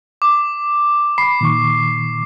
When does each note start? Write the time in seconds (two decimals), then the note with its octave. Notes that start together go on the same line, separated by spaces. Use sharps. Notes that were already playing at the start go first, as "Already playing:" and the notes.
0.22 D6
1.18 B5 D6 C7
1.41 A#2 D#3 C#6